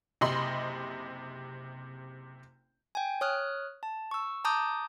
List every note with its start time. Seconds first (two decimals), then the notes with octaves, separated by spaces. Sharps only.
0.21 F#1 C3 D#5 B5 C6
2.95 G5 G#5
3.21 C#5 D#6 F6 F#6
3.83 A5
4.11 C#6 E6
4.45 A5 A#5 D6 D#6 G6